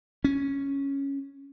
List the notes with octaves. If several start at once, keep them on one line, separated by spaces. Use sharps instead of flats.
C#4